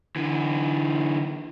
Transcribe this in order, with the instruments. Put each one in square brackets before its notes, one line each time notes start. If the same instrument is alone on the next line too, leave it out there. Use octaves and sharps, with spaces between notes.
[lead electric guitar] D3 E3